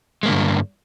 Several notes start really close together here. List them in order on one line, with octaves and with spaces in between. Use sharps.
G#3 A#3 D3 G2